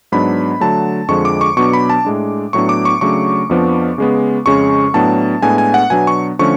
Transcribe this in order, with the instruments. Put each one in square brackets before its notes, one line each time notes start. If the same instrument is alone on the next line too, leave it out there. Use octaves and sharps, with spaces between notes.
[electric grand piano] G#2 F#3 B3 D4 B5
D3 F#3 A3 A5
F2 D3 F3 G#3 C#6
D6
C#6
B2 F#3 B3 D4 C#6
B5
A5
A2 G#3 D4
A2 F#3 B3 D4 C#6
D6
C#6
C#3 F#3 A3 D4 C#6
F2 F3 B3 D4
C#3 G#3 B3
F2 C#3 G#3 C#4 C#6
A2 F#3 B3 D4 A5
A2 G#3 B3 D4 G#5
G#5
F#5
B2 F#3 B3 D4 G#5
C#6
D3 F3 A3 C#4 C#6